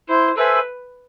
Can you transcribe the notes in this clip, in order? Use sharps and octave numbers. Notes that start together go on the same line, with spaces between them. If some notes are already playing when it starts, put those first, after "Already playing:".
E4 C5
A4 B4 C5 E5 G#5